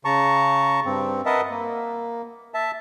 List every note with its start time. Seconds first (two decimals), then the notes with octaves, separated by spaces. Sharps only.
0.05 C#3 A5 A#5 C#6
0.85 G2 C4
1.26 A#4 B4 D#5 E5 F#5 A5
1.50 A#3
2.54 E5 A5